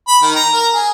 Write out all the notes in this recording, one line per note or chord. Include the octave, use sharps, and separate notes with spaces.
B5
D#3
A#5
A#4
G#4